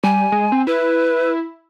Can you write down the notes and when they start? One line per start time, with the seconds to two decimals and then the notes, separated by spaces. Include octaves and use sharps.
0.04 G3 G#5
0.32 G#3
0.52 C4
0.67 E4 B4